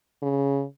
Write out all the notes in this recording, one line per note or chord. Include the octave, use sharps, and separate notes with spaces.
C#3